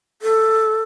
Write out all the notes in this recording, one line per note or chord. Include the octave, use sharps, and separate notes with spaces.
A4